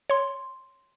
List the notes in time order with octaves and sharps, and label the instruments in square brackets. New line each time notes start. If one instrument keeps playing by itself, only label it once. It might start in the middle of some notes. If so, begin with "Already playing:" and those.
[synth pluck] C#5 C6